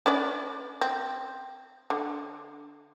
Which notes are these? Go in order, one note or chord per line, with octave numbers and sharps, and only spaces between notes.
C#4 B4 D5
C4
D3